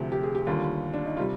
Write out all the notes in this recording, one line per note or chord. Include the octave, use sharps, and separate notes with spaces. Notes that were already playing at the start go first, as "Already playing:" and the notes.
Already playing: D2 C3 F3 G4
G4
G#4
G4
D#2 D3 G3 F4
D4
D#4
C3 G3 F4